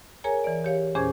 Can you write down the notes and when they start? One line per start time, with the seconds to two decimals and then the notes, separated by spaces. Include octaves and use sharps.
0.24 G#4 A#4 C#5 G#5 A#5
0.44 E3 D5
0.64 G4 C#5 F5
0.95 E2 A#2 C#4 G#4 C5 G#6